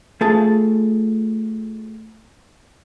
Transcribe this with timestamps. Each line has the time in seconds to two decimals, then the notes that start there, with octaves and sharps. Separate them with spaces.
0.21 A3 F4 G#4 A4 F5 A5